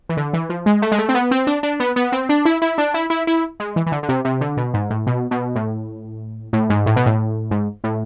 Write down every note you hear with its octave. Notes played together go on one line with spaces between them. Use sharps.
E3
D3
E3
F3
G#3
A3
G#3
A3
C4
B3
C4
D4
D4
B3
B3
C4
D4
E4
E4
D4
E4
E4
E4
G#3
E3
E3
D3
D3
C3
C3
D3
B2
G#2
A2
B2
B2
A2
A2
G#2
A2
B2
A2
G#2
A2